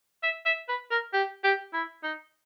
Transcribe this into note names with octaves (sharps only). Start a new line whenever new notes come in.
E5
E5
B4
A#4
G4
G4
E4
D#4